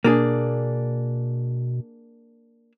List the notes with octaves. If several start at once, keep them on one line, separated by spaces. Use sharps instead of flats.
B2 A#3 D4 G#4